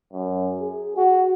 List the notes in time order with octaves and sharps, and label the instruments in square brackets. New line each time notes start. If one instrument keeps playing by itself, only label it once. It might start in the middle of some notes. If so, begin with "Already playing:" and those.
[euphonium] F#2
G#4
F#4